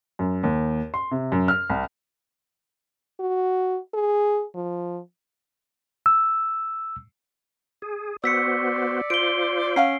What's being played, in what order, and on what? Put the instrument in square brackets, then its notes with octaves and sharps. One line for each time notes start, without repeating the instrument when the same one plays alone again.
[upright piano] F#2
D#2
C6
C3
F#2
F6
C2
[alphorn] F#4
G#4
F3
[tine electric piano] E6
[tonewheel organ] G#4
[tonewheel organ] B3 F#4 C5 [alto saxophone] D5 [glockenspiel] E6 B6 C#7
[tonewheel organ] F4 C5 [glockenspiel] D7 G7
[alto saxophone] C#4 [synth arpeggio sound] F5 F#5 A#5 [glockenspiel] C7